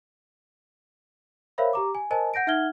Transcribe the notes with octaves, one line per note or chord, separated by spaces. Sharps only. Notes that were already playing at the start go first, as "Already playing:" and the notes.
A#4 C5 C#5 E5 F5 B5
G4 A#5 D6
G#5
A#4 C5 D#5 G#5 A5
F#5 G6 A#6 D7
D#4 E5 F#5 F6 G#6 G7